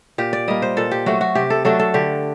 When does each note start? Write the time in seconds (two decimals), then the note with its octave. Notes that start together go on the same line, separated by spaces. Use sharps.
0.18 A#2 G4
0.33 D5
0.48 G3 A#3 D#5
0.62 C5
0.77 A#2 A4
0.91 G4
1.06 F#3 A3 F#4
1.21 F#4
1.35 C3 G4
1.50 A4
1.65 F#3 A3 D4 A4
1.79 A4
1.94 D3 G4